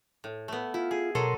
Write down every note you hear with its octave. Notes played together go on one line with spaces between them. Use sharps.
A2
A3 B3
E4 F4
G#4
B2 F#3 A4 A#4 D#5 C6